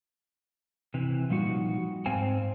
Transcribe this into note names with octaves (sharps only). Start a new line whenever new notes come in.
C3 E3
A#2 F3 G3 D#4 F#4
G#2 C4 C5 F5 G5 G#5